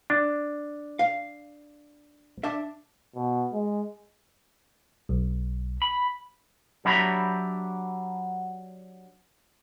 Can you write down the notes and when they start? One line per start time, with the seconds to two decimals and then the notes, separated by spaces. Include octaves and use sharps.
0.10 D4
0.99 F5
2.43 D4 E5
3.15 B2
3.53 G#3
5.09 B1
5.82 B5
6.85 F#3 D4 G4 E5 A#5 B5